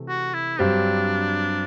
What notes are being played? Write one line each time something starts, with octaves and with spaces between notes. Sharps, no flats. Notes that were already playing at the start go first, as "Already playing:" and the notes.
Already playing: C3 E3 A3
F#4
E4
G2 F#3 C4 D4 G4 C5